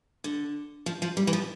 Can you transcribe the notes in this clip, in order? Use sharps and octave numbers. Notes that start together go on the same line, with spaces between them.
D3
F3
F3
G3
E3
F3